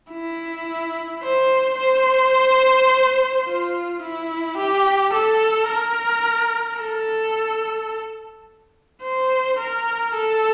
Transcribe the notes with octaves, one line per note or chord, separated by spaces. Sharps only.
E4
C5
C5
F4
E4
G4
A4
A#4
A4
C5
A#4
A4